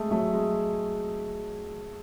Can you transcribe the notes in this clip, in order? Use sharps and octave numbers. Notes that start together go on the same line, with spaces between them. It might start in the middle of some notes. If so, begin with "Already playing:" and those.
Already playing: G#3 A3
F#3 A3
G#3